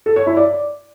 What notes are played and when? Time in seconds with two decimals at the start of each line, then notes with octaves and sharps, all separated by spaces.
0.06 A4
0.16 C#5
0.26 E4
0.37 D5